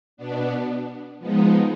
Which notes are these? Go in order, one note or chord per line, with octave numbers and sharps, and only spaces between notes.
B2 B3 D4
F3 G#3 B3 D#4